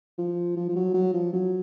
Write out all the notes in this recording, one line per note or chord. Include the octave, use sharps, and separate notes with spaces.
F3
F3
F3
F#3
F#3
F3
F#3